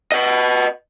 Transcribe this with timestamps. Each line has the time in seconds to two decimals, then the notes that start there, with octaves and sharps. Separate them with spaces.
0.12 B4 D#5